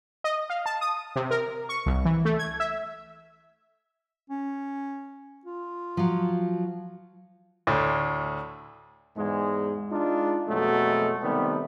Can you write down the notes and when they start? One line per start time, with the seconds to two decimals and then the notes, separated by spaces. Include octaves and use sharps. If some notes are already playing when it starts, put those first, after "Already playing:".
0.24 D#5
0.50 F5
0.66 A5
0.81 D#6
1.16 C3
1.31 A#4
1.69 C#6
1.86 C2
2.05 E3
2.25 A3
2.39 G#6
2.60 E5
4.30 C#4
5.45 F4
5.97 F3 F#3
7.67 D2 A2
9.17 E2 G#2 G#3
9.91 G#3 D4 D#4 F4
10.49 F2 B2 F#3 G#3 A3
11.23 C3 D#3 G3 A3 B3